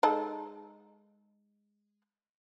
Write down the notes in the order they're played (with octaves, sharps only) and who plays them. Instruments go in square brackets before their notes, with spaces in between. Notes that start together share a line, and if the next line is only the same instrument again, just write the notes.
[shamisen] G#3 D#4 A4